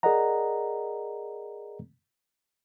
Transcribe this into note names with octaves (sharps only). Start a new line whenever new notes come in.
G#4 A#4 D5 D#5 F#5 A#5